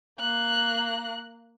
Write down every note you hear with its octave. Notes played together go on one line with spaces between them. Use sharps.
A#3 F#6